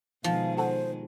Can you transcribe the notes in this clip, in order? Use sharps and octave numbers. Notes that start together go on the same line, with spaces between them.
B2 D#3 F3 G#3 F5
F#4 A4 C5 F#5